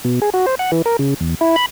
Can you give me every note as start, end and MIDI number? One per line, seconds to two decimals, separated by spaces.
0.05 0.20 47
0.22 0.30 68
0.34 0.46 66
0.46 0.55 72
0.59 0.71 78
0.72 0.82 52
0.86 0.97 70
0.99 1.14 49
1.21 1.35 40
1.41 1.56 64
1.56 1.66 83